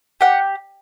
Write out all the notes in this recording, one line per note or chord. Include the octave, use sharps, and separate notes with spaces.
G4 F#5